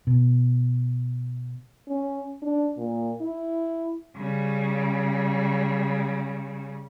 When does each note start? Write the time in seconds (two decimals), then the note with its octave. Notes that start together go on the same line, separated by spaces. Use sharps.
0.07 B2
1.88 C#4
2.42 D4
2.78 A#2
3.21 E4
4.17 C#3 G3